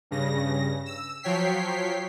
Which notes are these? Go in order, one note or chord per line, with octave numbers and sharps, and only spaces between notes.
G2 C#3 A#6
E6
F3 F#3 C#5 G5 B6 C7